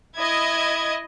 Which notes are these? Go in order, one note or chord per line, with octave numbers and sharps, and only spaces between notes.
E4 D#5 G#6